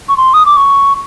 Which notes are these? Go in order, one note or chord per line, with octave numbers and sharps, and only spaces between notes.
C#6
C6
D#6
D6
C#6